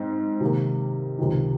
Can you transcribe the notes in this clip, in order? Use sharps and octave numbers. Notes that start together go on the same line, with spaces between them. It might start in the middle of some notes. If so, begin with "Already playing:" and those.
Already playing: G#2 C4
C3 D#3 A#3
C#2 C3 D#3